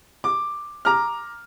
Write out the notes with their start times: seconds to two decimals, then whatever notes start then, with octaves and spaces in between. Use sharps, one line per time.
0.24 D6
0.85 A#5 D6 F6